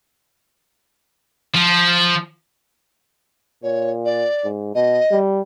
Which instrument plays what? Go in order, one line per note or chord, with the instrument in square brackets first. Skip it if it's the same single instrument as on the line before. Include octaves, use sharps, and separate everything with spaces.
[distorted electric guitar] F3
[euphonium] A#2 [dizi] C#5
[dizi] D5
[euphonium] G#2
[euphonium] B2 [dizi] D#5
[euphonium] G3